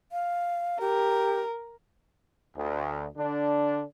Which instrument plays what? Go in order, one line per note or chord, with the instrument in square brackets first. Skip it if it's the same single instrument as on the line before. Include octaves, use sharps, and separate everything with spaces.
[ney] F5
[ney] G4 [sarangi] A#4
[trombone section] D2
D3 D4